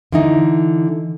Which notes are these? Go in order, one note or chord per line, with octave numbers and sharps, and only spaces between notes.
D3 E3 D#4